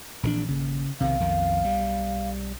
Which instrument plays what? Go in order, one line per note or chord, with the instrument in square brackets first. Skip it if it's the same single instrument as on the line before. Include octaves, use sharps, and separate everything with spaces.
[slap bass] A#1 D#3 D4 [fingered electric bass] A#2 E3 C4
[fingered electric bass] G#1 A#3 [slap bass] C#3
[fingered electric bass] B1 B3 [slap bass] C3 D#3 [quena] F5
[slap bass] F2 D#3
G3